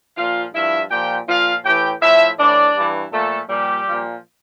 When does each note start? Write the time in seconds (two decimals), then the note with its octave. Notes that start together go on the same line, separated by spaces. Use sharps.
0.16 A#2 F3 F4 F5
0.53 G2 F3 E4 E5
0.90 A#2 F3 G4 G5
1.27 A#2 F3 F4 F5
1.64 A2 E3 G4 G5
2.01 A2 F3 E4 E5
2.38 A2 E3 D4 D5
2.76 G2 E3
3.12 A#2 F3 A3 A4
3.49 A#2 F3 G3 G4
3.87 A#2 F3